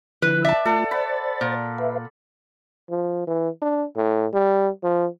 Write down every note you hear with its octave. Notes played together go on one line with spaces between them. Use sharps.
D3 F3 E4 B4
D5 E5 A5
A3 F4 A4 F#5
C5 D5 F#5 B5 A6
A#2
B4 E5 F5
F3
E3
D4
A2
G3
F3